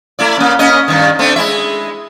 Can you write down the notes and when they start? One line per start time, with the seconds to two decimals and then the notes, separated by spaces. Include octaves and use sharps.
0.19 A3 E4 D5
0.38 A#3 C#4
0.59 A#3 C#4 D#5
0.88 G2 D#3
1.19 A3 C4 D4
1.36 G#3 E4 E5